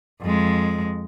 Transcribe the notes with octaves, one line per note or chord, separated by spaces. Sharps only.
F2 G#3